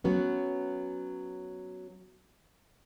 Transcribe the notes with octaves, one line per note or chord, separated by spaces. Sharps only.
F#3 B3 C#4